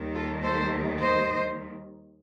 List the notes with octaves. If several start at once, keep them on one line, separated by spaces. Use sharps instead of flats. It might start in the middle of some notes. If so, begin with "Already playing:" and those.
Already playing: D#2 D#3 G3
F4 A4
A4 C5
C5 D#5